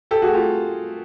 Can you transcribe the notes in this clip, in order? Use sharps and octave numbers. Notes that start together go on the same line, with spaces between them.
G4 A4
F#4 G#4
F4 G4